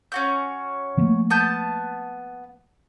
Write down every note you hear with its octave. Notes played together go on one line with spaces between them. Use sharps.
C#4 F#4 G6
F3 A3 A#3
B3 A5 G6